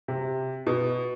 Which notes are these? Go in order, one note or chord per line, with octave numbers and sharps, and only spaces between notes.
C3
B2